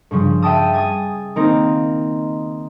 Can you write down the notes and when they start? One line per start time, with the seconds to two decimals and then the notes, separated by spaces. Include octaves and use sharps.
0.11 G2 C#3 F3
0.42 E5 G5 A5 D#6
0.73 G#5 D#6 A6 D#7
1.36 D#3 A#3 C4 D#4